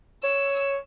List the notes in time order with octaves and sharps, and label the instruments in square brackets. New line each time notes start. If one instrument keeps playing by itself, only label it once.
[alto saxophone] C#5 [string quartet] E6